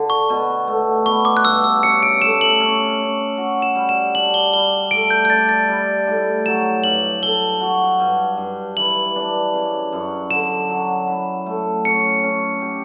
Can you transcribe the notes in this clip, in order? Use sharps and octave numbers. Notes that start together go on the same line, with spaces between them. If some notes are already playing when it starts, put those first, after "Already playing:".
Already playing: D3
C#6
B2
A3
B3 C#6
D6
F#6
G2 E6
E6
C#4 C#7
D7
A3 E7
F#7
C#4
C#4
F#4
E7
G3
E7
D4 F#7
G7
G3 G7
A3 D7
G6
G6
D4 A6
A6
G3
A2
F#3 E7
G2 F#7
A4 G7
F#4
G2
G2
E3 F#7
D4
C#3
F#2
D3 E7
F#3
E4
A3
C#4 C#7
C#4
G4